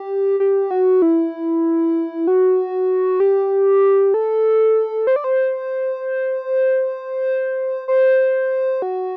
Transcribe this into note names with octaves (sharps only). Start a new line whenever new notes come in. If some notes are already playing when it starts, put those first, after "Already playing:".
Already playing: G4
G4
F#4
E4
F#4
G4
A4
C5
D5
C5
C5
F#4